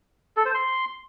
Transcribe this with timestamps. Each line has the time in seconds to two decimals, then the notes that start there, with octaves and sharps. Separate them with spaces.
0.37 A4
0.46 C5
0.54 C6